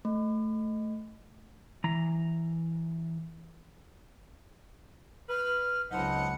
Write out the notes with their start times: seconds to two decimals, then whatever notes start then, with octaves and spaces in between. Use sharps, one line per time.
0.05 A3
1.84 E3 A#5
5.29 B4 F6
5.91 C#2 F#3 C4 D#4 F#5 A5 B5